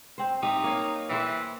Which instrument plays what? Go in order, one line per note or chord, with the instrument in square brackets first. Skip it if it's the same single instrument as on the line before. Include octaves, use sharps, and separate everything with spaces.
[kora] C4 C5
[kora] C4 G4 E5 [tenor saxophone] D#4
[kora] A#3 C#5 F5
[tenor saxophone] E3 [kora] C5 E5 G5